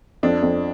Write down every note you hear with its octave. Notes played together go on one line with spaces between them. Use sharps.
F2 D4
F2